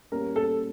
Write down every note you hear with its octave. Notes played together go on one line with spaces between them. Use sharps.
A#2 G3 A#3 C#4 A#4
A4